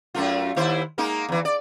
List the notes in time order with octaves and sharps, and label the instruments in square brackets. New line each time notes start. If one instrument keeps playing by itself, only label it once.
[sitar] F#2 A3 F4
D#2 E4 C5
G#3 A#3 D#4
E2 E3
D5